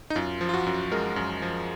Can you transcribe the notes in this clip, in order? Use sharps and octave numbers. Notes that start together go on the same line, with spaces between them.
D#4
F#2 F4
F3
F4
F#4
F#2
G#3 A#4
F#2
F3